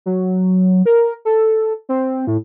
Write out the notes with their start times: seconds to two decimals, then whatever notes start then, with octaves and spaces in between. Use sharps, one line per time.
0.06 F#3
0.86 A#4
1.25 A4
1.89 C4
2.27 A2